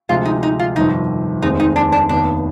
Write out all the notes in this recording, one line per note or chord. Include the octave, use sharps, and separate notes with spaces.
D2 C3 F3 G#3 F4
D#4
D#4
F4
G1 F2 C3 D#3 D#4
F1 D#2 D#3 G#3 C4 D#4
D#4
D4
D4
F1 D#2 D#3 B3 D4